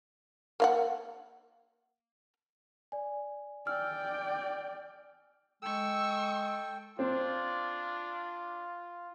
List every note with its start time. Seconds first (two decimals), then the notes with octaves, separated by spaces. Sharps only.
0.60 A#3 F5 F#5
2.92 D5 G#5
3.67 D5 G5 G#5 E6 F6
5.63 G#3 A4 G5 C#6 E6
6.99 C4 D4 F4